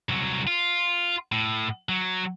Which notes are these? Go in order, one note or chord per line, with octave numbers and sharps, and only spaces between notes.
C2 F#3
F4
A2
F#3